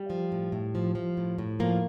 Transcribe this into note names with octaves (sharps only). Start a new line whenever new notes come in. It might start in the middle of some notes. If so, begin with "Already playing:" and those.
Already playing: G3
F3
A2
A2
F3
F3
A2
A2
F3 A#3